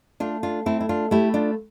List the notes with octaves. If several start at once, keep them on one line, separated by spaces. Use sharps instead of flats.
A3 D4 F4
D4 F4
A3 C4 E4
E4
D4 F4
A3 E4 G4
D4 F4